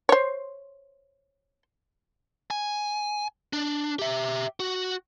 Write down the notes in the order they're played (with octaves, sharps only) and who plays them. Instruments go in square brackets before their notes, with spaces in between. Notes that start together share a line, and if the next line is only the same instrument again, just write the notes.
[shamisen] C5 C#5
[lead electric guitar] G#5
D4
G4 E5
F#4